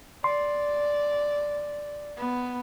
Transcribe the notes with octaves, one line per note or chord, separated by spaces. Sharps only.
D5 C6
B3